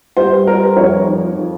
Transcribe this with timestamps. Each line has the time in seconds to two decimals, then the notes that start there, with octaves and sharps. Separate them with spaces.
0.17 G3 C5
0.47 G3 A#4
0.77 F2 C#5
1.07 F3 D#4
1.37 F3